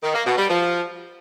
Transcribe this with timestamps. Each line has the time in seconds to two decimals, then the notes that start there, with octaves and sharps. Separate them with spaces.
0.03 D#3
0.14 A#3
0.26 B2
0.37 G3
0.49 F3